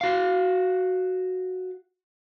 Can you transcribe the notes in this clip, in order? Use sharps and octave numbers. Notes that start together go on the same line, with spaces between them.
F#4 F5